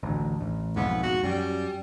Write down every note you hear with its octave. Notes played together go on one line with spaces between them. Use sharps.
A1 D2
A1
B1 F2 G#2 B3
F#4
F#2 G3